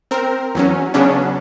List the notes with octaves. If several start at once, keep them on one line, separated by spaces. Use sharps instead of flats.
C4 A#4
E2 F#3 C#4
C#3 F#3 B3 C#4 D4